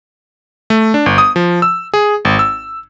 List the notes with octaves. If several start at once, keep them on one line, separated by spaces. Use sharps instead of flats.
A3
D4
G1
D#6
F3
E6
G#4
G#1
E6